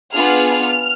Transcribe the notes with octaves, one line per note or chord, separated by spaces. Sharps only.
B3 D4 F4 G#4 F6